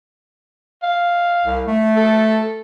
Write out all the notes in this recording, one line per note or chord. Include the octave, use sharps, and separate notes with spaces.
F5
C2
A3
A4